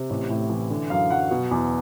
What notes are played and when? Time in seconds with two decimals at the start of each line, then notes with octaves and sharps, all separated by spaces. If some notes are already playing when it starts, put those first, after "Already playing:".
Already playing: C3
0.10 A1
0.30 A2
0.50 E3
0.70 D3
0.90 F#2 F5
1.10 F#3 F#5
1.31 B2
1.51 E2